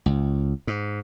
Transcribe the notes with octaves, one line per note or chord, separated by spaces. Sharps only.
C#2
G#2